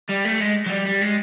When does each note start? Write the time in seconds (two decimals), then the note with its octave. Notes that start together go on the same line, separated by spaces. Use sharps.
0.09 G3
0.25 A3
0.41 G#3
0.67 F#3
0.70 G3
0.87 G3
1.02 G#3